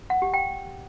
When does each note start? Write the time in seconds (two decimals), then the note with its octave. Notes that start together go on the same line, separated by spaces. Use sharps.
0.10 F#5
0.22 G4
0.34 G5